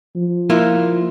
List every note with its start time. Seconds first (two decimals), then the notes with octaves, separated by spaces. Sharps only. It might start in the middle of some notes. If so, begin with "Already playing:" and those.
0.15 F3
0.50 A#3 E4 F4